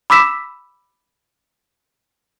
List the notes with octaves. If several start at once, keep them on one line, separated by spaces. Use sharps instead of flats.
B5 D6 E6 B6 E7